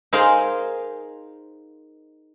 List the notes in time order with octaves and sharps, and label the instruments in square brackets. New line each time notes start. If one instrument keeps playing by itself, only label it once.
[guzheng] D#4 G#4 A#4 C5 D#5 F5